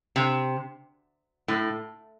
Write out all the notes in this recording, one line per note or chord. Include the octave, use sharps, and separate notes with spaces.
C3
A2